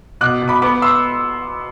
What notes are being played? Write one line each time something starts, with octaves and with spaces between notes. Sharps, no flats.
B2 D6 F#6
B2
B5 D6
B3 B5 D6
C6 E6